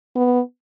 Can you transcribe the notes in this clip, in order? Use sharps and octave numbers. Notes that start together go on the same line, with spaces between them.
B3